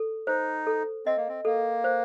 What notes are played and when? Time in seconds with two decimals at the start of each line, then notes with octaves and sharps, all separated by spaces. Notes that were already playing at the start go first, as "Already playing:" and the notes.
Already playing: A4
0.27 D#4 C5
0.67 A4
1.06 C4 D#5
1.17 A#3
1.28 C4
1.45 A#3 A4
1.84 C5